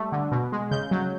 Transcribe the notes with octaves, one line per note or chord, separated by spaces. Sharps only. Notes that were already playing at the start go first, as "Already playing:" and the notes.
Already playing: G3 A3
D3
B2
G#3
C#3 G6
F#3